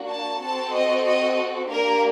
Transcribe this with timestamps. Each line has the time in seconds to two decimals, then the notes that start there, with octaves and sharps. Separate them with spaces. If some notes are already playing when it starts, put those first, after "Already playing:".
Already playing: A#3 D4 F#4
0.10 A5
0.41 C4 F#4 A4 A5
0.73 D#5
1.07 D#5
1.70 A#3 D4 G4 A#4